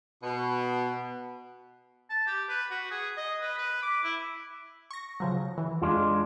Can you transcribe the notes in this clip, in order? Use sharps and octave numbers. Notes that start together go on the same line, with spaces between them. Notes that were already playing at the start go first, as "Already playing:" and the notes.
B2
A5
G4
B4
F#4
G#4
D#5
B4
B4
D6
E4
C#6 A#6
C#3 F3 F#3
E3
F2 G#3 D4 F4